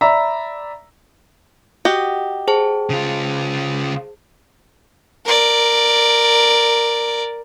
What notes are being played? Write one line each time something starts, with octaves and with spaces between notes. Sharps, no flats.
D5 E5 A#5 B5
F#4 G4 D#5
G#4 C5 A5
C#3 F4
A#4 D5